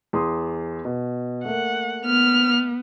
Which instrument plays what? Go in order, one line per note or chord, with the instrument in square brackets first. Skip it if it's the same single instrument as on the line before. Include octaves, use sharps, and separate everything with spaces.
[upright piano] E2 C6 D#6
B2
[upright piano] A3 A#3 [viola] F#5
[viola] B3 [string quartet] F6